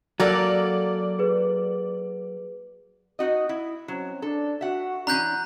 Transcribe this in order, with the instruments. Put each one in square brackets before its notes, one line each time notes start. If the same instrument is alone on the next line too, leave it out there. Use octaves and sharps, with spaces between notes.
[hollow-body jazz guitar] F#3 [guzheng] A#3 A4 A#4 [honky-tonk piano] D5
[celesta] G#4 B4
[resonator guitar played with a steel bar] D#4 F#4 D#5
E4
[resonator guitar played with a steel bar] F#3 [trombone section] C4 C#4
[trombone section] D4 [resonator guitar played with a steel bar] A4
[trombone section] F#4 [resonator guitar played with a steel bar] E5 F#5
[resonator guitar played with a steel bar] E3 C#4 D4 [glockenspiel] A#5 F#6 G6